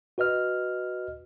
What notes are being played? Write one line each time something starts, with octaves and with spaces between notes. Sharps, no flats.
F#4 B4 D#5 F6